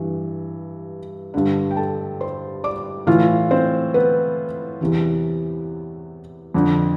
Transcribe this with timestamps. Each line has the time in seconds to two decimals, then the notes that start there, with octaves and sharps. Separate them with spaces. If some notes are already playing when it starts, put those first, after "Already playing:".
Already playing: G2 E3
1.34 G2 D3
1.71 G5
1.77 A4 A5
2.21 C5 C6
2.64 D5 D6
3.07 A2 E3 F4 F5
3.51 C4 C5
3.94 B3 B4
4.81 E2 C3 E3
6.54 F2 D3